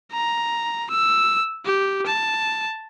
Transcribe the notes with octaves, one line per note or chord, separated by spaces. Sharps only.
A#5
E6
G4
A5